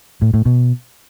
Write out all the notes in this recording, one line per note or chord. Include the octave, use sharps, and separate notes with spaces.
A2
A2
B2